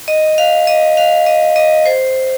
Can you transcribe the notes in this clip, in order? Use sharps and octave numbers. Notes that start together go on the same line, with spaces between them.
D#5
F5
D#5
F5
D#5
D#5
C5